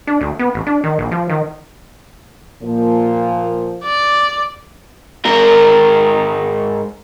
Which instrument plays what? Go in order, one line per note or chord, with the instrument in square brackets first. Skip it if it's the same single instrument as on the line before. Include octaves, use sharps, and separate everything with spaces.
[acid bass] D4
D2
B3
A1
D4
D#3
A#1
F3
D#3
[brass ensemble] A#2 F3
[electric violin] D5
[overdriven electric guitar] G#2 A#4